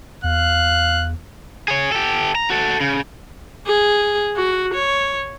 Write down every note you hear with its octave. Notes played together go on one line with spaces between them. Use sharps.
E2 F5 F#6
G#4 C#5
G4 A4
A#5
F#4 A4
C#3
G#4
F#4
C#5